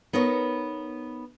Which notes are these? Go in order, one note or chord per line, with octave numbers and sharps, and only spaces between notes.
B3 D#4 A#4 C#5